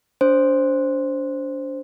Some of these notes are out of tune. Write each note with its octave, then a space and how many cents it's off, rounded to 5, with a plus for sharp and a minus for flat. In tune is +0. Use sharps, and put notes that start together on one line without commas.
D4 -35 C5 +0